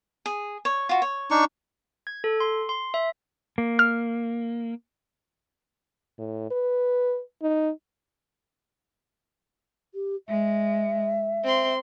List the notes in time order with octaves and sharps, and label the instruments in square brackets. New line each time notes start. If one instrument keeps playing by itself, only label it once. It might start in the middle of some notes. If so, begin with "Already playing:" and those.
[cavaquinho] G#4
C#5
F4 F#4
C#5
[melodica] D4 D#4 C#6
[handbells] G#6
A4
C6
C6
E5
[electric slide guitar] A#3
[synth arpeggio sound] F6
[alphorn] A2
B4
D#4
[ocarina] G4
[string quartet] G#3 [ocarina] E5
[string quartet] C4 C6